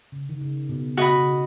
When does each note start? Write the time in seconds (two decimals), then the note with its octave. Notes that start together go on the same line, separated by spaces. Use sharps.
0.12 C#3
0.29 D#3
0.41 C#3
0.69 B2
0.97 C#3 F#4 D#5 B5
1.18 C#3